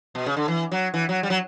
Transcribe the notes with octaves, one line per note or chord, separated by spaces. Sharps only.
B2
C#3
D3
E3
F#3
E3
F#3
G3
F#3